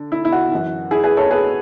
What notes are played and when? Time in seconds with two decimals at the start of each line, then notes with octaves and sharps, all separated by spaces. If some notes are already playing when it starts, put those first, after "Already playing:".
Already playing: D3
0.12 E4
0.25 E4
0.32 F#4
0.51 F#2 E3
0.91 E4 G#4
1.04 G#4 B4
1.17 A4 C#5
1.31 G#4 B4